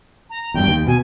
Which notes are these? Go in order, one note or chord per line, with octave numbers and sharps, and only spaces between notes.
A#5
E2 G2 G5
D#2
B2 G#5